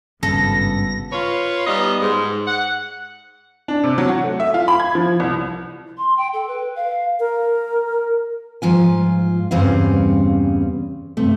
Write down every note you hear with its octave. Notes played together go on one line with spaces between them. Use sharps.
G#1 G2 C#3 B3 A4 A#6
F4 B4 C#5
G3 B3 D#4 D#5
G#2
F#5
D4
C3
F#3
F#4
A3
E5
F4
B5
G#6
F3
C2
C6
G5
A4
B4
F5
A#4
G#2 F3 F4 G#5
E2 G2 C#3 C4 C#4 F5
G2 C3 A3